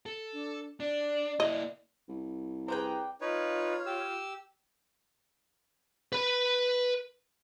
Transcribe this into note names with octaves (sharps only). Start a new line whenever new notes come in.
A4
D4
D4 D5
A#3 E4 D#5
C2
G#4 B4 C5 D5 F#5 G5 A#5
D#4 F4 B4 C#5
G4 E6
B4 B5